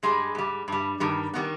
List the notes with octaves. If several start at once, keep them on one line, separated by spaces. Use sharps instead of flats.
G2 G3 G#3
G#2 G3
G2 G3
G2 D#3 G3
D#3 G3 B3